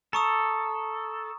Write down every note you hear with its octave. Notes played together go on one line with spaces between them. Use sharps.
A4 A#5 C#6 D#6